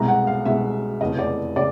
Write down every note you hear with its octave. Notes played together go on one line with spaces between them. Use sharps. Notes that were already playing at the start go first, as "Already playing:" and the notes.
Already playing: C2 B2 G#3 A#5
F#5
F5
C2 B2 G#3 E5
F1 E2 C#3 D#5
D5
C#3 D5